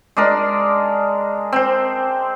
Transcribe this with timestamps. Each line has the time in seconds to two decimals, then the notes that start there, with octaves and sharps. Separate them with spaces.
0.17 G#3 D4 A#4
1.52 C4 C5